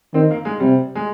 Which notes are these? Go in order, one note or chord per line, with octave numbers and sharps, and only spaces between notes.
D#3 C4
A#3
G#3
C3 G3
G#3